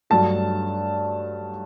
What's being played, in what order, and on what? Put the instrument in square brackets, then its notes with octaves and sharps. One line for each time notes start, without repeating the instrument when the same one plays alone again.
[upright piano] G2 F#3 A3 A5